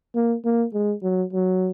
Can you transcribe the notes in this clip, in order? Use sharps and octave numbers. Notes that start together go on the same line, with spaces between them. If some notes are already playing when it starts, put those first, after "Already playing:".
A#3
A#3
G#3
F#3
F#3